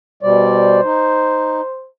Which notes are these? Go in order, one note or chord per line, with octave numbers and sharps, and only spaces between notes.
B2 G3 C5 D5
D#4